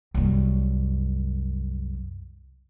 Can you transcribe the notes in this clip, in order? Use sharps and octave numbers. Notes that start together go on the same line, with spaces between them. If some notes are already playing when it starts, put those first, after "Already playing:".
C2 F#2